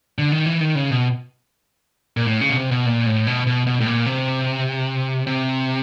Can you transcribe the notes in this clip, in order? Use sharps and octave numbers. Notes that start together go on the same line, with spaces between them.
D3
D#3
E3
D#3
C#3
B2
A#2
A2
C#3
B2
C3
B2
A#2
A2
B2
B2
B2
A2
A#2
C3
C3